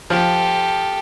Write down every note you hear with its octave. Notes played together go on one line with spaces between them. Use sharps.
F3 G4 A4